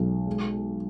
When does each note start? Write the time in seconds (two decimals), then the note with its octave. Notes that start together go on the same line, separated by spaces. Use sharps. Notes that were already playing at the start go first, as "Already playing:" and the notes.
Already playing: B1 G#3
0.27 G#3